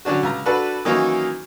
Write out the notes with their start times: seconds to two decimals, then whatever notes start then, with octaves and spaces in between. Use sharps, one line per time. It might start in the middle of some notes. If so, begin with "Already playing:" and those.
0.05 D3 F#3 C#4 D4 F#4
0.23 C#2 A#5
0.46 D4 F#4 A4 B4
0.85 D#3 E3 F#3 A#3 C#4 D#4